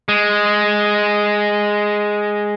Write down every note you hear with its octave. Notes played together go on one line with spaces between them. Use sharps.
G#3